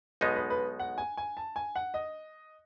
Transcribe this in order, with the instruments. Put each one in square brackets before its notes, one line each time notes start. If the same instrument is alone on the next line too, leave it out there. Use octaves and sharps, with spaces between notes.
[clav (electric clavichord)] B1 B2 G#3 B3 D#4 [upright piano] D#5
[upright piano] B4
B4
F#5
G#5
G#5
A5
G#5
F#5
D#5